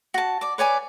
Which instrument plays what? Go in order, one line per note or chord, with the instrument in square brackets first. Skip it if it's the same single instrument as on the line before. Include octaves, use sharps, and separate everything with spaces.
[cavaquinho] F#4 A5
D5 D6
B4 C#5 D5 G#5